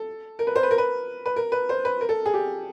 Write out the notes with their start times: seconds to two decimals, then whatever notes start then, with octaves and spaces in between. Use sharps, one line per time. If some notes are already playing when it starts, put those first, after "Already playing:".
Already playing: A4
0.39 A#4
0.47 B4
0.56 C5
0.63 B4
0.71 A#4
0.78 B4
1.26 B4
1.36 A#4
1.52 B4
1.69 C5
1.85 B4
2.01 A#4
2.09 A4
2.26 G#4
2.34 G4